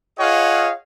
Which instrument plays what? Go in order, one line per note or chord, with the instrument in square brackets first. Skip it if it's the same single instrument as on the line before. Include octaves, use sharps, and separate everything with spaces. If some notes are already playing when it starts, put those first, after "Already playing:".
[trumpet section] F4 G#4 C#5 D#5 F5 F#5